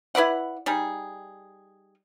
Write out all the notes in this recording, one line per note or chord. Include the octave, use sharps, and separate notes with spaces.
E4 B4 D5 F#5
G3 D#4 G#4